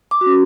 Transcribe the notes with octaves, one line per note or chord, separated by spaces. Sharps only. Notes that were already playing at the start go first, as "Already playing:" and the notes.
D6
F#4
C#4